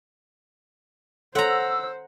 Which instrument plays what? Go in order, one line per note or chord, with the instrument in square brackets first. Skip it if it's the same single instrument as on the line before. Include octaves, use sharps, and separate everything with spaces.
[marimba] A4 C#5 C6 [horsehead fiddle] C5 [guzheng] F#5 A#5 [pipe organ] E6